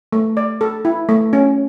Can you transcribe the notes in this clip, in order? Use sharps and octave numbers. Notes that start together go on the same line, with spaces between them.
A3
D5
A4
E4
A3
C#4